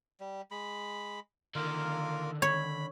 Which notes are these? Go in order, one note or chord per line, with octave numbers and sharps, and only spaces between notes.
G3
G#3 B5
D3 D#3 A#3 F4 A#4
C#5 B5